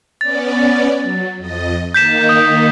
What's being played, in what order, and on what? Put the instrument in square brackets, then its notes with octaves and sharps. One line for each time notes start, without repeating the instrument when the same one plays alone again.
[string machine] B3 C#4 D5 [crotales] A6
[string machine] F#3
F2 D#5
[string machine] D#3 A#3 D#4 [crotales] G6 B6 E7
[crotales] D#6